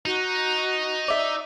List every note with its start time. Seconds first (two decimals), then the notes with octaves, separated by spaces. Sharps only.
0.06 D#4 F#4
1.08 D5 E5